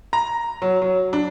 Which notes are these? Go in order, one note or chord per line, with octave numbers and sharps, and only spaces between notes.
A#5
F#3
F#3
D4